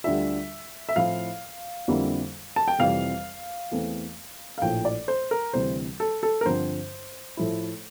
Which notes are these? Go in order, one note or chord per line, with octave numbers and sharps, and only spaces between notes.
D2 D3 G3 D4 F4 E5
E5
A2 F3 C4 E4 F5
F2 D3 G3 A#3 E4
A5
G5
F1 F2 E3 G3 F5
E2 E3 A3 C4
F5
A#1 A2 F3 G5
D5
C5
A#4
D2 C3 E3 G3 C5
A4
A4
A#4
G2 D3 F3 C4 C5
A2 F3 A3 E4